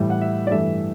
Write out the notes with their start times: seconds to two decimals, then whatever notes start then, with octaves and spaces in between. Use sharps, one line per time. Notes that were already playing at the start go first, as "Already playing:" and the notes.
Already playing: A2 E3 G3
0.10 F#5
0.21 E5
0.47 D5
0.51 G2 E3 A3 E5